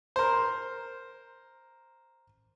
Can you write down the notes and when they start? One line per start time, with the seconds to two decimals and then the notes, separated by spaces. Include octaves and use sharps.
0.16 A#4 C5